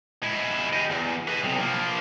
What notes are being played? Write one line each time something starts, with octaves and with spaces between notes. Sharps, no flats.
G#3 E4
G4 D#5
E2
B4 D#5
B1 C3
F3 A#3